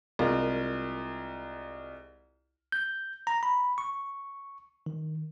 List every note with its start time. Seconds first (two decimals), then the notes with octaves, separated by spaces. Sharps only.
0.19 C2 G#3 F4 A#4
2.72 G6
3.27 A#5
3.43 B5
3.78 C#6
4.86 D#3